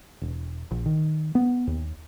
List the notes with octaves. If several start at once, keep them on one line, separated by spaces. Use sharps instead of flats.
E1
A#1
D#3
B3
D#2